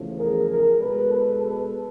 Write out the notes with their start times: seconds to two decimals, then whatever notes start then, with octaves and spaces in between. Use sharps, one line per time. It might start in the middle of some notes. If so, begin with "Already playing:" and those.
Already playing: E2 C#3 F3 A3
0.19 G#4 A#4
0.50 G#4 A#4
0.80 B2 G#3 A4 B4
1.10 A4 B4
1.41 A4 B4